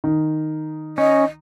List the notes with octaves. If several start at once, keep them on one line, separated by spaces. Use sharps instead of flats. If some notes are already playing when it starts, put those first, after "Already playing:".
D#3
C#4 D#5